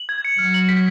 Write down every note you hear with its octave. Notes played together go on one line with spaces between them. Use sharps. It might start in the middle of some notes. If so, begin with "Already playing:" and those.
Already playing: F#7
G#6
C#7
F#3 F6
F#7
B6